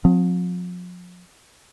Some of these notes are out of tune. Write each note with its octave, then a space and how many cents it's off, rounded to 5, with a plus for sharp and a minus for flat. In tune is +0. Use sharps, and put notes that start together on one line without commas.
F3 +40 C4 +5